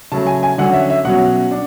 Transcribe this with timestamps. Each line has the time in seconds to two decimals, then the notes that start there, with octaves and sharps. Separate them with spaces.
0.12 C#3 F#3 A3 A5
0.27 G#5
0.43 G#5
0.58 D3 F#3 C#4 F#5
0.73 E5
0.90 E5
1.05 B2 F#3 C#4 F#5
1.51 D4